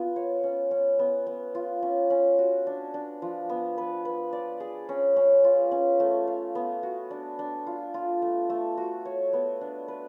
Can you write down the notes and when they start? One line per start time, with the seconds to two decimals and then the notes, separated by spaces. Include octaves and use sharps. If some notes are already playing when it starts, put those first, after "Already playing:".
Already playing: B3 F4
0.16 C#5
0.43 C#4
0.71 C#4
0.99 B3
1.27 B3
1.55 F4
1.83 C#4
2.10 C#4
2.39 F#4
2.67 D4
2.94 D4
3.22 F3
3.49 B3
3.78 B4
4.05 B4
4.33 D5
4.60 G#4
4.89 C#4
5.16 C#4
5.44 F4
5.71 C#4
6.00 A3
6.27 F5
6.55 B3
6.83 F#4
7.10 D4
7.39 D4
7.67 F4
7.94 F4
8.22 A3
8.50 A3
8.78 F#4
9.05 C#5
9.33 B3
9.61 D4
9.88 B4